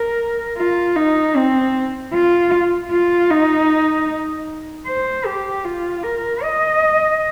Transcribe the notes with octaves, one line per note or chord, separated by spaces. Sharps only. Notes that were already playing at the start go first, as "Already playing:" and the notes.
Already playing: A#4
F4
D#4
C4
F4
F4
D#4
C5
G4
F4
A#4
D#5